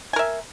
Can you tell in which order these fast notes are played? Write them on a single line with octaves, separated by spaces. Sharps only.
G#5 A#4 E5